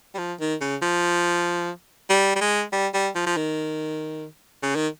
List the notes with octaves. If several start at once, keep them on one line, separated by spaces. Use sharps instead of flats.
G3
F3
D#3
C#3
F3
G3
G3
G#3
G3
G3
F3
F3
D#3
C#3
D#3